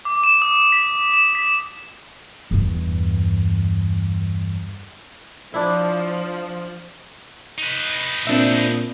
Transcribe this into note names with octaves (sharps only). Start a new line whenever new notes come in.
D6
E7
D#6
B6
E7
B6
E2 G2
F3 D4 E4
D#4 B4
A#2 C4 D4 E5